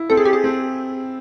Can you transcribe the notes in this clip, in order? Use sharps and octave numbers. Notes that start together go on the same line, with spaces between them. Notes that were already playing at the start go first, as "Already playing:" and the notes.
Already playing: E4
C4 A4
G#4
G4
G#4
C4